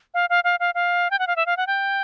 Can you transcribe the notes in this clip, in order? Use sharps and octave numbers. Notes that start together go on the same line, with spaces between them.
F5
F5
F5
F5
F5
G5
F#5
F5
E5
F5
F#5
G5